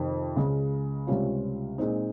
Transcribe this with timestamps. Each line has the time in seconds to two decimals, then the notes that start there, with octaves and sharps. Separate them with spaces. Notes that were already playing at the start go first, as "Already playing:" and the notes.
Already playing: F2 C3 D#3
0.36 C#2 C#3 G#3
1.07 C#2 C3 G3 C#4 F4
1.78 A#2 G#3 C4 D#4